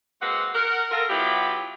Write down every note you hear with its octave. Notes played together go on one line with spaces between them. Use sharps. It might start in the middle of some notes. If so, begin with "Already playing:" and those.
G#3 A#3 C4 F#4 B4 F#5
A#4 F#5
F4 A4 A#4
F#3 B3 E4 F4 G4